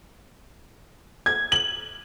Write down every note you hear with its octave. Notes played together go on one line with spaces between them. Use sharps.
G#6
F#7